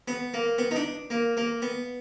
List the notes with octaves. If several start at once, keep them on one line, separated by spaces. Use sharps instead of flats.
B3
A#3
B3
D#4
D4
A#3
A#3
B3